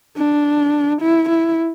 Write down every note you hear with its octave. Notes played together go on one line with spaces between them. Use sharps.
D4
E4
E4